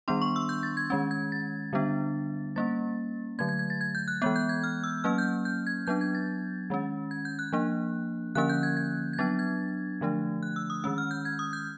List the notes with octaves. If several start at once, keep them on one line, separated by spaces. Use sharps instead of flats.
D#3 G3 B3 D4 C6
C#6
E6
G6
A6
G#6
D#3 G#3 C#4 G#6
G#6
A6
D3 G3 B3 D4
G3 A#3 C#4 A6
D3 F#3 A3 G#6
G#6
G#6
A6
G#6
G6
F#6
E3 G#3 B3 F#6
G6
G#6
F6
E6
F#3 A#3 C#4 F6
G6
G6
G#6
F#3 B3 D4 G6
G#6
A6
D#3 G#3 C#4
G#6
G6
F#6
F3 A#3 D4
D3 F3 A#3 C#4 F#6
G6
G#6
G#6
G#6
F#3 B3 D4 A6
G#6
D3 F3 A3 D4
F#6
E6
D#6
D#3 G#3 C#4 E6
F6
G6
G#6
D#6
G6